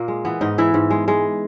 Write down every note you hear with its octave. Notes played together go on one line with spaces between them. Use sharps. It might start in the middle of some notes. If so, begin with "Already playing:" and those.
Already playing: A#2 A#3
G#3
E3 B3
G#2 D#4
E3 E4
G#2
G#3
G#3